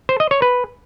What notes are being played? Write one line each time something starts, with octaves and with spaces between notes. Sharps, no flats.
C5
D#5
C#5
B4